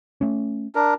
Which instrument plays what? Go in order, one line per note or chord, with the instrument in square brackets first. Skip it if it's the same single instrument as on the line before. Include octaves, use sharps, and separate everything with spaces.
[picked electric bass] A3 C#4
[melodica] D4 A#4